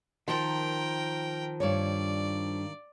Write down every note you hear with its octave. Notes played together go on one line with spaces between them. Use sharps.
D#3 F3 A#4 G5
G2 C#5 D5